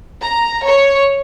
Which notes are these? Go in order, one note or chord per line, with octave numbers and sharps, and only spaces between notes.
A#5
C#5